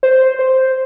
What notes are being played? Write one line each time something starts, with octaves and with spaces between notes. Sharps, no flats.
C5
C5